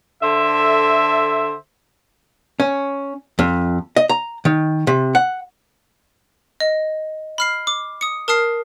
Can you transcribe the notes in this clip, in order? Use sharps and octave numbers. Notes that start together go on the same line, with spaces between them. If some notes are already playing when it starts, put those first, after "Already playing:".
D3 A4 C5 E5
C#4
F2
D#5
A#5
D#3
C3
F#5
D#5
B5 F6 C7
D6
D#6 C#7
A#4 A5 D#6 F6 C7